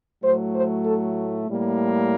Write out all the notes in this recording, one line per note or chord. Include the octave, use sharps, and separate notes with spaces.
A2 F#3 A3 C5
C5
A4
A2 G3 A#3